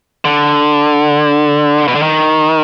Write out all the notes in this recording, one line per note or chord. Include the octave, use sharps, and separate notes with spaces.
D3
B2
D3
D#3